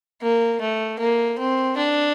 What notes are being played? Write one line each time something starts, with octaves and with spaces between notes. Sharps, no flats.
A#3
A3
A#3
C4
D4